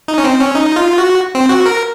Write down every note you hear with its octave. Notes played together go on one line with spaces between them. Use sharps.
D#4
C#4
C4
C#4
D#4
F4
F#4
C4
F#4
A#4